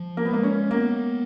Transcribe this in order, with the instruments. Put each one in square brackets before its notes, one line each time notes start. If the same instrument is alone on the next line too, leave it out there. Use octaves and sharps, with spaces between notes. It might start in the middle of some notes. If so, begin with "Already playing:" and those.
Already playing: [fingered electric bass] F3
[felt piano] A#3
B3
[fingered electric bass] G#3 [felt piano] A#3
[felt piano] C#4
[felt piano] A#3 [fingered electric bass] B3